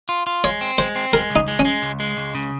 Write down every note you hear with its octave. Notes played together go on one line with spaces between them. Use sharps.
F4
F4
G#3 C#5
C4
G#3 C5
C4
G#3 A#4
C#2
D#4
G#3
C#4
G#3
C#2
G#3
C#2
C#3